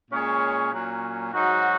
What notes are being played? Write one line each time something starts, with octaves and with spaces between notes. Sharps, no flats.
A#2 G#3 C#4 G#4 C#5
A#2 F#3 C#4
G#2 F#3 D#4 F#4